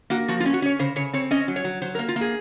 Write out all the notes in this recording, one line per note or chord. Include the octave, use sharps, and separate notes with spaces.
A#3 F#4
F3 F#4
F4
C#4
F#4
C#4 C#5
C#3 C5
C#3 C#5
C4 C#5
C#4 D#5
F#3
C#5
F#3
F#3 C5
A#4
A#3
F4
A#3
G#4